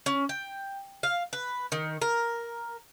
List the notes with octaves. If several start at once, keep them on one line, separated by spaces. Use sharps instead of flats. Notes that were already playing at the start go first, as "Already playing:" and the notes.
C#4
G5
F5
B4
D#3
A#4